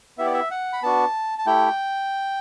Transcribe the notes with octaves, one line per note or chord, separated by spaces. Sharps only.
B3 E4 G4 E5
D5
E5
F#5
B5
B3 D4 F#4 A5
A5
A3 E4 G4 G5